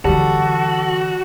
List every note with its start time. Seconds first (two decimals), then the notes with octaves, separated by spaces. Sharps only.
0.05 D3 E3 G3 F#4 A4